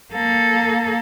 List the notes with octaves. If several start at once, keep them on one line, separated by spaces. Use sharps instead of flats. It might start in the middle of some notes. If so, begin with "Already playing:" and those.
A#3 A4